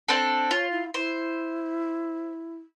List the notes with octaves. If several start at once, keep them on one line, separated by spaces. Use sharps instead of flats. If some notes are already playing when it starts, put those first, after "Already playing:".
C4 D4 A4
F4 C#5
E4
E4 C5